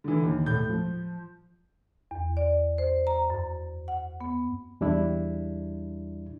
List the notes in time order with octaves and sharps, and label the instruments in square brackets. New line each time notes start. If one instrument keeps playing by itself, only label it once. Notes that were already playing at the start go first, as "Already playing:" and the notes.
[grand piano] D3 E3
D#2
A2 G6
F3
[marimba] E2
D5
C5
A#5
F#2
F#5
B3
[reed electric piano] E2 G3 D4 E4